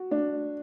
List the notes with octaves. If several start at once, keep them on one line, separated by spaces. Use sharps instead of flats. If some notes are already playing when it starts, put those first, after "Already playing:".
Already playing: F#4
D4